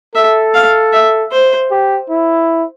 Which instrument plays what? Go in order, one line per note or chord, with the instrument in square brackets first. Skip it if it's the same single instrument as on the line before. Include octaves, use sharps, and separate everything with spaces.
[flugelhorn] A4 [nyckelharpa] E5
[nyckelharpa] F5
E5
C5
[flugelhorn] G4
E4